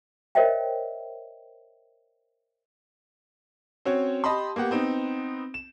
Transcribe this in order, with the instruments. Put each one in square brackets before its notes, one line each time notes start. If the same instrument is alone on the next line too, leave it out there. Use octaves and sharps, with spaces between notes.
[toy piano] A#4 C5 C#5 D#5 E5 G5
[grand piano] C4 C#4 F#4 C#5
G4 D#5 A5 B5 C6
A#3 B3 G4 F#5
B3 C4 D#4
E7